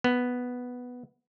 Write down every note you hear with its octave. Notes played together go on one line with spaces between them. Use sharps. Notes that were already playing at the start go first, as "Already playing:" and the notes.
B3